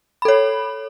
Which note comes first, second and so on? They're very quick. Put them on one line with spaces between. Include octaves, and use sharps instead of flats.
B5 A4 C#5